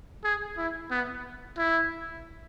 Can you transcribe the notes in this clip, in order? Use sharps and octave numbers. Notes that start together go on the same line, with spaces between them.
G#4
E4
B3
E4